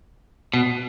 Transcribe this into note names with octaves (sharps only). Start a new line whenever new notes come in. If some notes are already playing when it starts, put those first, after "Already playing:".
B2